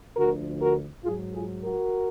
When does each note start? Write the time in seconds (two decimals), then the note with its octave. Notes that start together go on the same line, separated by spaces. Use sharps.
0.16 D2 D3 F3 F#4 A#4
0.61 F#4 A#4
1.05 G#2 F4 G#4
1.10 F#3
1.34 F4 G#4
1.64 F#4 A#4